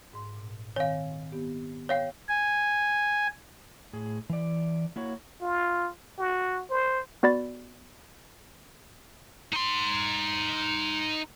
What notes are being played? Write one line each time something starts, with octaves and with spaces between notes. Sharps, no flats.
G#2 C6
A#2
D#3 C4 C#5 F5 G#5
B3 G4
C#5 F5 G5
G#5
A2 G#4
E3 D5
A#3 E4 F#4 C#5
F4
F#4
C5
B3 F#4 D5 B5 A6
D#4 C6